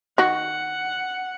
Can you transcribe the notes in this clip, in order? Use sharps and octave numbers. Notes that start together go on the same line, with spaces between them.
D#3 F#4 F#5